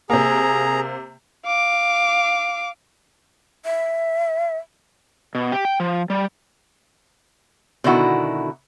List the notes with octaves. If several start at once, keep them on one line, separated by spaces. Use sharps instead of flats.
C3 A#3 G#4 A#5
F5 D6
E5
B2
G4
G5
F3
G3
B2 D3 D#3 E4 F#4